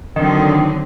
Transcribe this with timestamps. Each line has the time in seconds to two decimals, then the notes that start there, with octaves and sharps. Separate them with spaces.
0.16 D3 D#3 F#3 C4